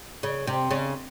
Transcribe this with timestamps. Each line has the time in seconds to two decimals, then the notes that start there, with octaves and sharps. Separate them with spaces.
0.23 C#3
0.47 C3
0.71 C#3